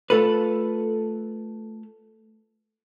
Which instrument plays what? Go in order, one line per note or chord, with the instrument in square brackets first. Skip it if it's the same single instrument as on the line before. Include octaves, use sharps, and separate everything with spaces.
[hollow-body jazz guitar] A3 F4 A4 B4